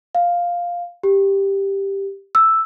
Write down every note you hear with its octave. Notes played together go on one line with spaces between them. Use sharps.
F5
G4
E6